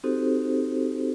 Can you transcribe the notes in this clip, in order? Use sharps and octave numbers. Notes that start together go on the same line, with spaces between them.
C4 D#4 F#4 G4 A4 C5